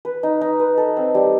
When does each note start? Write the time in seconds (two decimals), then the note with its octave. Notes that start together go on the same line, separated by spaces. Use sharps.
0.05 B4
0.23 D#4
0.41 D#4
0.59 B4
0.78 A4
0.97 C4
1.15 G3